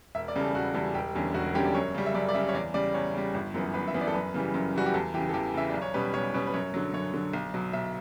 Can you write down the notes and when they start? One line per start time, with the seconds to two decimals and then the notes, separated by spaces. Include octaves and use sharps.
0.15 E1 E5
0.28 D5
0.35 E2 C#3 G3
0.41 A4
0.55 E1 F#4
0.74 E2 C#3 G3 A4
0.94 E1 G4
1.15 E2 D3 G3 C#4
1.34 E1 F#4
1.54 E2 D3 G3 C#4 G4
1.65 D5
1.75 F#2 C#5
1.94 C#3 G3
2.06 E5
2.14 F#2 D5
2.29 D5
2.34 C#3 G3 E5
2.49 C#5
2.54 E2 D5
2.74 C#3 G3 D5
2.94 E2 C#5
3.14 C#3 G3
3.34 G1
3.54 F#2 E3 B3
3.74 G1 B4
3.87 E5
3.94 F#2 E3 B3
4.01 D5
4.07 A4
4.14 F#2 B4
4.34 C#3 E3 G3
4.54 F#2
4.74 C#3 E3 G3 F#4
4.86 G4
4.94 E2 A4
5.14 E3 G4
5.18 C#3
5.29 A4
5.34 E2 G4
5.54 C#3 E3 E5
5.70 B1 D5
5.82 C#5
5.94 B2 G3 C#4 B4
6.14 B1 C#5
6.34 B2 G3 C#4 B4
6.47 B4
6.54 F#2 C#5
6.74 D3 F#3
6.93 F#2 C#5
7.13 D3 F#3
7.33 B1
7.54 B2 F#3
7.73 B1 E5